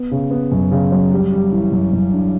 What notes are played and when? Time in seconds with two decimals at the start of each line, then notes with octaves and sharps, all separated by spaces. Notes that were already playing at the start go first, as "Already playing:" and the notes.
Already playing: B3
0.11 C#3
0.31 B3
0.52 F#2
0.72 C#3
0.92 F#3
1.12 G3
1.32 G3
1.52 E3
1.72 F#2
1.93 F#2
2.13 D4